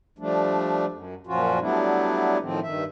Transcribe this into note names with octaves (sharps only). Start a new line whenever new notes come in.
F3 G3 A3 D4
F#2
F#2 A#2 F3 C#4 F4 F#4
F#3 G3 A3 B3 D4 E4
A2 D#3 F3 C4
G2 D#3 E5